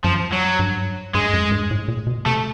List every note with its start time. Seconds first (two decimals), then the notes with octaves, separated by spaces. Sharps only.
0.04 F#2 F3
0.33 F#3
0.59 G2
1.15 G2 G#3
1.33 F#2
1.51 G2
1.71 A2
1.88 A#2
2.07 B2
2.26 C3 A3